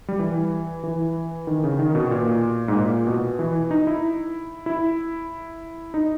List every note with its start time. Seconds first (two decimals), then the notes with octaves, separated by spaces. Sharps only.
0.08 G3
0.19 E3
0.83 E3
1.47 D#3
1.64 C#3
1.79 D#3
1.95 B2
2.11 A#2
2.68 G#2
2.75 A#2
3.07 B2
3.39 E3
3.71 D#4
3.87 E4
4.66 E4
5.94 D#4